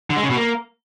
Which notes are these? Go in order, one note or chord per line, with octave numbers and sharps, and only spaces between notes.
D3
G#3
C#3
B2
A#3